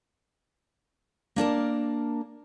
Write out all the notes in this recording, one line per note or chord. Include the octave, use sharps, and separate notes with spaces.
A#3 D4 A#4 A5